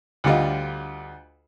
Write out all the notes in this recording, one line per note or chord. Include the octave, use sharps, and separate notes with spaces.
D2 D3 G3 F4 D#5